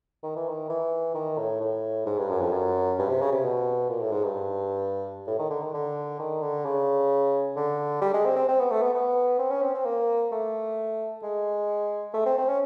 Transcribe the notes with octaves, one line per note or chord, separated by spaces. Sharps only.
D#3
E3
D#3
E3
D#3
A2
A2
G#2
G2
F#2
F2
F#2
G2
C3
C#3
C3
B2
A#2
A2
G#2
G2
A2
D#3
D3
D#3
D3
D#3
D3
C#3
D3
G3
G#3
C4
C4
C4
B3
A3
B3
B3
C4
C#4
C4
C4
A#3
A3
G#3
A3
C4
C4
C#4